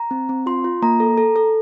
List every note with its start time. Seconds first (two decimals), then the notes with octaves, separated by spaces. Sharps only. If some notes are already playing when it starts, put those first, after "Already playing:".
Already playing: A#5
0.11 C4
0.29 C4
0.46 F4 C6
0.64 F4
0.82 A#3 A#5
1.00 A4
1.18 A4
1.36 A4